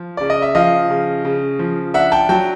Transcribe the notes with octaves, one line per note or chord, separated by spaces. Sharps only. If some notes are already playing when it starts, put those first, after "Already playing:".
Already playing: F3
C#3 D5
D#5
E5
F3 D#5 F5
C#3
C#3
F3
D4 E5 F#5
G5 A5
F#3 G5 A5